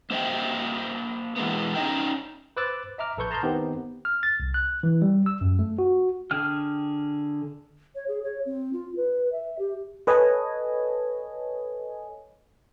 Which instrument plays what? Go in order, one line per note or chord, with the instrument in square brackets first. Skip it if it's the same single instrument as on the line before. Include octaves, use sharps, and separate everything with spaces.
[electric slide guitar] A#3 C5 D#5 E5 G5
E3 G#3 A#3 B3
C#4 D#4 D#5 G5
[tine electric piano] B4 C5 D6 E6 F#6 A6
D#5 E5 A#5 D6 F6
A#1 A4 B4 C#6 G6
A5 A#5 C6 D#6 F6 G6
D#3 B3 C4 D#4 G4
F6
A6
C2
F#6
E3
G3
E6
F#2
A3
F#4
[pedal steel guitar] D3 G#4 G5 F6
[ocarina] C#5
G#4
C#5
C4
F4
B4
E5
G4
[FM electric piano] A4 B4 C#5 D#5 G#5